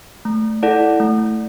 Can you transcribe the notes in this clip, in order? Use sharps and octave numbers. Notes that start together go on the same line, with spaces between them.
A3
E4 A4 D5 F#5
A3